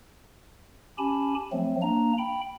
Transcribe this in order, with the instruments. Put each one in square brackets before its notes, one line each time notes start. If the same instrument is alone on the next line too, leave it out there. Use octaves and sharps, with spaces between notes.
[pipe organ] C#4 G4 G#5 A5 B5
F3 F#3 A3 C4
A#3 D4 A#5
G5 B5